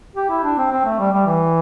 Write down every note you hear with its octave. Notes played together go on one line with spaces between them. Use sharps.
G4
E4
D4
C4
C4
A3
G3
G3
E3